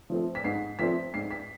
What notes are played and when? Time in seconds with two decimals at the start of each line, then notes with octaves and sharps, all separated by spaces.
0.10 F3 A3 C4
0.35 B6
0.44 G#2 C7
0.79 F3 A3 C4 B6
1.14 G#2 C7
1.31 B6